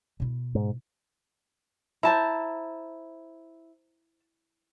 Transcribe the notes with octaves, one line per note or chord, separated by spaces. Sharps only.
B2 E4
G#2
E4 C5 A5 A#5